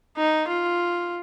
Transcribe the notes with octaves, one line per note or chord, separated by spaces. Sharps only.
D#4
F4